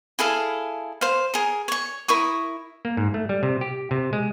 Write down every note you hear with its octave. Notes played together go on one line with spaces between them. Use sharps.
E4 G#4 A4 F5
C5 F5
G#4 A#4
C#5 C#6
E4 A#4 C#6 D#6
A#3
G#2
A3
G3
C3
G4
C3
G#3